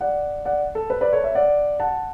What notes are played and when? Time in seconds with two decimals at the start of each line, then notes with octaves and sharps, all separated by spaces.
0.01 D5 F#5
0.45 D5 F#5
0.75 A4
0.90 B4
1.01 B4 D5
1.12 A4 C#5
1.24 C#5 E5
1.35 D5 F#5
1.80 F#5 A5